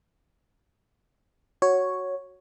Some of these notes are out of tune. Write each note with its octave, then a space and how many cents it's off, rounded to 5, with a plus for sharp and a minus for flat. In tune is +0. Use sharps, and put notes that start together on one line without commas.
F#4 +0 C#5 +0